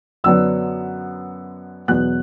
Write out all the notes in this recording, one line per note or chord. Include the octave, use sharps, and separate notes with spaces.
F#2 D3 F#3 B3 E6
E2 B2 F#3 B3 F#6